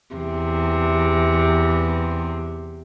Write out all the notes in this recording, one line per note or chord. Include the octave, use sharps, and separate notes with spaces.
E2 C3